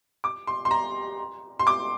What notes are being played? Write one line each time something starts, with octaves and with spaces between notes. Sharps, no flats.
D6
C6
C6
A#5
C6
D6